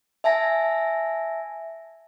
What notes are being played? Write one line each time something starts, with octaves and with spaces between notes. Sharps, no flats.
E5 G#5 A5 A#6